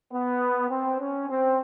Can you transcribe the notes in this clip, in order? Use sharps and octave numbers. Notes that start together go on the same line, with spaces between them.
B3
C4
C#4
C4